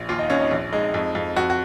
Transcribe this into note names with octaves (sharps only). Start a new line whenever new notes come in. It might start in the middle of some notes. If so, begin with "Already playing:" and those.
Already playing: A#1
D#2 F4
D#4
D#2 C#4
D#4
A#1
G#3 D#4
F2
F2
F2 F#4
F#4